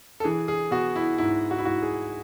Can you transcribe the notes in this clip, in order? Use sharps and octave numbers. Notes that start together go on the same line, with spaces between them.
A4
E3 G#4
G#4
B3 F#4
E4
G#2 E4
F#4
E4
G#2 F#4
G#4